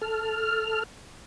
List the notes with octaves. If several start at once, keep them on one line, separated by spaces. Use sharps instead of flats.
A4 F6